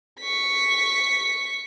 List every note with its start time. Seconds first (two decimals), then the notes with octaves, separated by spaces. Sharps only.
0.20 C#6 B6